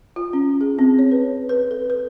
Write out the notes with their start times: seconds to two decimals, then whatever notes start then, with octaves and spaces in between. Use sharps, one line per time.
0.16 F4
0.33 C#4
0.61 G#4
0.79 C4
0.99 C#5
1.11 B4
1.49 B4
1.71 A4
1.90 B4